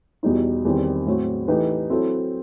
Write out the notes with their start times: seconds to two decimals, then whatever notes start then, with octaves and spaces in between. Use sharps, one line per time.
0.23 E2 B2 G3 D#4
0.65 E2 D#3 G3 C4
1.06 A2 F#3 C4 F#4
1.48 E3 A3 D#4 G4 B4
1.90 F#3 C4 E4 A4